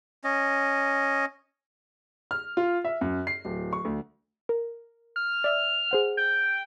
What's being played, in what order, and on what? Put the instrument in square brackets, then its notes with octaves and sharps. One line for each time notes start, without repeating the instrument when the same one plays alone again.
[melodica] C#4 D#5
[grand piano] F6
F4
E5
F#2
C7
D1
C#6
D2
[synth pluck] A#4
[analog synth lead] F6
[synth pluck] D5 E5 E6
G#4 C5 F#5
[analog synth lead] G5